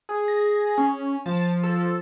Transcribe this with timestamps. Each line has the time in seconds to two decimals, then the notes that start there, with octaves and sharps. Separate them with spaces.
0.09 G#4
0.28 A#6
0.78 C#4
1.26 F3 A5
1.63 A4